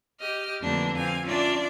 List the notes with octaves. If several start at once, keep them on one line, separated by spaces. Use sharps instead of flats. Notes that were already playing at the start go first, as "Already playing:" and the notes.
G4 D#5 F6
F2 D3 E3 A3 A#3 D4
C4 F5 G#5
C#4 D4 F4 D5 E5